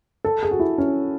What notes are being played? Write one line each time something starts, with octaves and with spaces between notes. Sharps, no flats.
A4
G#4
F#4
E4
C#4